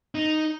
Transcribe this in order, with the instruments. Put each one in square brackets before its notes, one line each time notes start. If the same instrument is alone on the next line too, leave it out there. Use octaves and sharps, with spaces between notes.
[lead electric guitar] D#4